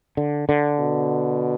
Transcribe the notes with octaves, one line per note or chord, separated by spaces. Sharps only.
D3
D3
B2